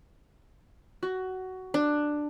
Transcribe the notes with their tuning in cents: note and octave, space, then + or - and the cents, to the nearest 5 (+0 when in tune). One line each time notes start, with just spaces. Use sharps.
F#4 +15
D4 +10